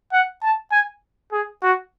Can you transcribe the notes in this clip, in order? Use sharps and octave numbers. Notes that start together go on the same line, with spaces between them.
F#5
A5
G#5
G#4
F#4